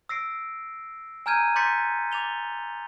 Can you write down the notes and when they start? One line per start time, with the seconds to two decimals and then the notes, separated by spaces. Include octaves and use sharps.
0.09 E6 A#6 C7 D7
1.26 G#5 A#5 F6 G6 G#6 D#7
1.56 C6 D6 G6 A6 B6 C#7
2.12 D6 A6 F7 G7